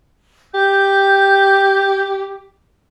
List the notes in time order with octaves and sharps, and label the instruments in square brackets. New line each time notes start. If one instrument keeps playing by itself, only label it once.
[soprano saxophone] G4 [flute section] G6